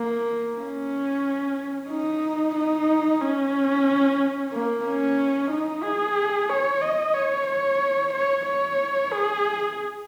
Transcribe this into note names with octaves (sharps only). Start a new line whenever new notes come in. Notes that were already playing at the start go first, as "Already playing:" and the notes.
Already playing: A#3
C#4
D#4
D#4
C#4
A#3
C#4
D#4
G#4
C#5
D#5
C#5
C#5
C#5
C#5
G#4